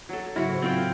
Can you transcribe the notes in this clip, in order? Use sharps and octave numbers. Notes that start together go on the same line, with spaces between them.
F#3 A4
G#2 C#3 F#3 E4 F#4
A2 C5
F#3 C4 F4 G5